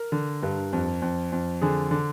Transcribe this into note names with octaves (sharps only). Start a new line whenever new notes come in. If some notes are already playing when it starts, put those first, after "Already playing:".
Already playing: A#4
D3
G2
F2
F2
F2
D3 G#4
D3